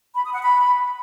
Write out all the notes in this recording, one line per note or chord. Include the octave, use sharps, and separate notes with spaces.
B5
D#6
F#5
B5